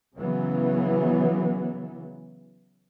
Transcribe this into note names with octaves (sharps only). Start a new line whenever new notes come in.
C#3 E3 F#3 B3